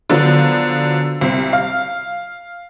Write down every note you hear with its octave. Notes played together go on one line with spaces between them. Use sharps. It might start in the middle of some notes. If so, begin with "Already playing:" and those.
D3 F3 F#3 B3
C2 C4
F5